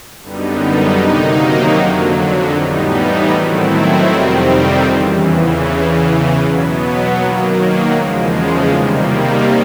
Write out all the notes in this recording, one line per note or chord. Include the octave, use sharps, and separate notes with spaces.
F#2 D3 G3 B3 D#4
C3 D#3 F#3 A#3 D#4
F2 D3 F#3
A2 E3 G3 B3 D#4
D#3 F#3 A3 C4 E4
F2 C3 D#3 G3 C4
E2 C#3 E3
E2 C#3 E3
B2 F#3 B3
D#3 F#3 A#3
E2 C#3 F3 G#3
C3 D#3 G3 A#3